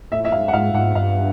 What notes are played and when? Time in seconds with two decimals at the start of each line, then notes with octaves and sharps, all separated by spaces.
0.12 A2 E5
0.25 E5
0.32 G#2 F5
0.48 F#5
0.53 G#2 F5
0.74 G#2 F#5
0.95 G2 F5